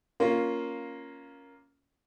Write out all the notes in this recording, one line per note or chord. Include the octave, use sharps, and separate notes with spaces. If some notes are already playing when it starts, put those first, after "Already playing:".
A#3 C#4 F4